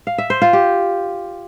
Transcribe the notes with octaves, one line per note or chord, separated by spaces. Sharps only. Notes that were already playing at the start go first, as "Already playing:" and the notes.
F5
E5
C5
F4
G4